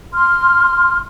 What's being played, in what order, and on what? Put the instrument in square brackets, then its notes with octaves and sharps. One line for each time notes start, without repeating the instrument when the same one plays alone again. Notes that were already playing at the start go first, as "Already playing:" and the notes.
[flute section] C6 F6